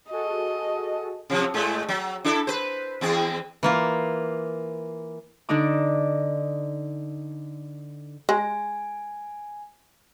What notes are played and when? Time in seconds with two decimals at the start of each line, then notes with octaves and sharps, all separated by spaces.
0.11 F#4 G#4 A4 D#5
1.30 C3 F3 F#3
1.54 A2 G#3 A3
1.89 F#3
2.24 D4 E4 A4
2.47 B4 C5
3.01 E2 C4 G#4
3.63 E3 A#3 F4
5.49 D3 D4 D#4 D6
8.29 G#3 G#5